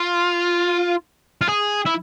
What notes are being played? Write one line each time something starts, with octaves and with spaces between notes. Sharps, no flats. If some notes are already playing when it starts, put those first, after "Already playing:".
Already playing: F4
F4
G#4
E4